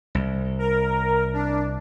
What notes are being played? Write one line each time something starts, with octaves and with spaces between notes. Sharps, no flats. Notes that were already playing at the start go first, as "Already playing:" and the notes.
C2
A#4
D4